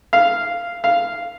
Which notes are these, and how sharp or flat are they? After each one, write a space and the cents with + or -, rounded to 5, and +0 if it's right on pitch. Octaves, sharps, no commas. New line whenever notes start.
F5 -10
F5 -10